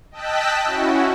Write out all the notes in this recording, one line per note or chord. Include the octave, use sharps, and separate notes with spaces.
D#5 G5 A5 E6 F#6 B6
C#4 E4 F#4